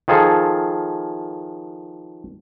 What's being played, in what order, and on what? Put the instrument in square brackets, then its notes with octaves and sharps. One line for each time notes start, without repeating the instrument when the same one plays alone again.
[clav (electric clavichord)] D#3 F3 G#4 A4